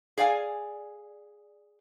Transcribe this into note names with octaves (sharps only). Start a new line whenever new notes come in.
G#4 D5 F5 G#5